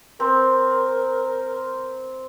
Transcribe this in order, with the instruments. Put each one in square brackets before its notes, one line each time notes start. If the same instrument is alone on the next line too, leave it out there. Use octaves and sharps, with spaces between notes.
[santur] C4 [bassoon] A#4